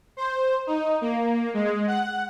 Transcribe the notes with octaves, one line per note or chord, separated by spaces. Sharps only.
C5
D#4
A#3
G#3
F#5